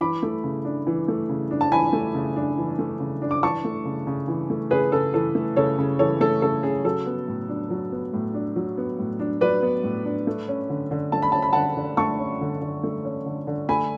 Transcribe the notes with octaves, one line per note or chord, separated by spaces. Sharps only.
E3 B5 D6
A3
C#3
D4
E3
A3
C#3
D4
A5
E3 G#5 B5
A3
C#3
D4
E3
A3
C#3
D4
D6
E3 A5 C#6
A3
C#3
C#3
E3
A3
C#3 G#4 B4
C#3 A4
E3 A4
A3
C#3 A4 C#5
C#3
E3 A4 C#5
A3 A4
C#3 A4
C#3 G#4
F#3 A4
B3
A2
D4
F#3
B3
A2
D4
F#3
B3
A2
D4
F#3 B4 D5
B3
A2
D4
A3
C#4
D3
D3
A3 A5
B5
C#4 A5
B5
D3 F#5 A5
D3
A3 A5 C#6
C#4
D3
D3
A3
C#4
D3
D3
A3 G#5 B5